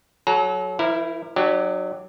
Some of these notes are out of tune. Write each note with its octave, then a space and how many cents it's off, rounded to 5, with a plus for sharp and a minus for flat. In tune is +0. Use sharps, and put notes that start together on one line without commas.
F#3 +0 A4 -40 A#5 +0
F3 -45 E4 +0 A#4 +0
F#3 +0 D4 +45 G4 +0